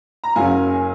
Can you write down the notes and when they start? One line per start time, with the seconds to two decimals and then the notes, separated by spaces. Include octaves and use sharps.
0.24 A#5
0.35 F#1 F#2 C#3 F#3 F5 G#5